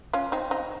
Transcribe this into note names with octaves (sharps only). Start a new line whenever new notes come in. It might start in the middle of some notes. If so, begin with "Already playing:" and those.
C#4 F4
C4 D#4
C4 D#4